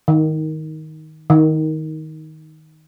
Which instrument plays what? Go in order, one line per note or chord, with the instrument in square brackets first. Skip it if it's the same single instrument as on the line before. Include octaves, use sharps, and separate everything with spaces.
[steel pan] D#3
D#3